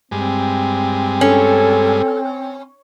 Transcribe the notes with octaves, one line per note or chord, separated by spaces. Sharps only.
G2 G#3 C4
C#4 A4